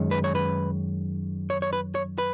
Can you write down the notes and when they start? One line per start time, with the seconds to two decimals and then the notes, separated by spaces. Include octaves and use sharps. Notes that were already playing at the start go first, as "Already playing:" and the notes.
Already playing: F#2 D#3 G#3 C#4
0.11 B4
0.24 C#5
0.35 B4
1.50 C#5
1.62 C#5
1.73 B4
1.95 C#5
2.18 B4